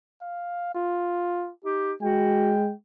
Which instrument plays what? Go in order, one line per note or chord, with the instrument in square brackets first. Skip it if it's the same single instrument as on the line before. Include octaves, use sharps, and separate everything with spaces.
[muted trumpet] F5
F4
[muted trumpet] D#4 [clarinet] G4
[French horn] G#3 [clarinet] F#4 [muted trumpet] G5